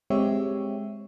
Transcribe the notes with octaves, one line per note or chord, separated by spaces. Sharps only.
G#3 C4 G4 C#5 E5